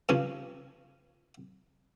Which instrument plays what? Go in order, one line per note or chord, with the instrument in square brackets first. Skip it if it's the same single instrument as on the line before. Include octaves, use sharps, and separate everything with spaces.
[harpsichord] G2 C#3 F3 C#4